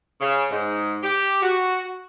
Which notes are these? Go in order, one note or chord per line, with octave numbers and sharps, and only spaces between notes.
C#3
G#2
G4
F#4